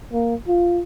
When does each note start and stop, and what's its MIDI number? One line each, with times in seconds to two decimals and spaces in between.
0.13 0.35 58
0.48 0.82 65